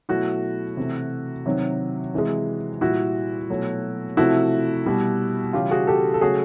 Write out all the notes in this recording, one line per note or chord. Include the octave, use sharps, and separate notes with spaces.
B2 F#3 A3 E4 F#4
C3 E3 A3
C3 D#3 F#3
C3 E3 G#3
A#2 G3 E4 F#4
B2 F#3 A3
C3 F3 A3 E4 F#4
B2 G3
C#3 E3 G3 F4 G4
F#4 G#4
G4 A4
A4
C#3 F#3 A3 F#4 G#4